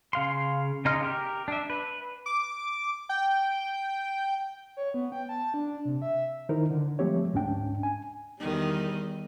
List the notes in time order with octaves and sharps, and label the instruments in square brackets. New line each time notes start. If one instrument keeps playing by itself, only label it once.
[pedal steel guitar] C#3 F5 C6
C#3 D#4 D#5 C6 F6
G4 A#4
D4 E5
B4
[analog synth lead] D6
G5
[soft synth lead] C#5
B3
G5
A5
D4
C3
E5
[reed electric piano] D#3 D#4 E4 A#4 C5
D3
F3 G#3 A3 C4 G4 C#5
D2 G#2 C#4 D4 G5
G#5
[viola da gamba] E2 D#3 G3